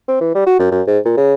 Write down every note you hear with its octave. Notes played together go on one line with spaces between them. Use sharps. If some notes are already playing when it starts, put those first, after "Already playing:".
C4
E3
G3
F#4
F#2
F#2
G#2
A#2
C#3